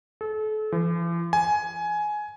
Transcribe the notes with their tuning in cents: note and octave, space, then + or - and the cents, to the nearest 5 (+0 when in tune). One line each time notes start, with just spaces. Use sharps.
A4 -35
E3 +45
G#5 +15